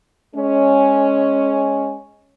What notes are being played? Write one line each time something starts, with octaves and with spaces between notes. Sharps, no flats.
G#3 C#4